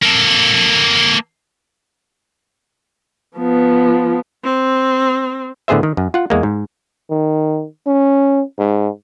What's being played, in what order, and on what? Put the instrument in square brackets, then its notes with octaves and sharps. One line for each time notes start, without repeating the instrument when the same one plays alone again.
[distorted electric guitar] A#3 A4
[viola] F3 B3
C4
[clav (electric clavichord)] A2 D3 B3 G#4 C5 E5
D#3
F#2
F4 F#5
E2 G#3 A#3
G#2
[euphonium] D#3
C#4
G#2